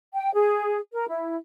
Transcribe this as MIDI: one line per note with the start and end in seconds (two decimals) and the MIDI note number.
0.14 0.33 79
0.35 0.78 68
0.93 1.06 70
1.09 1.36 64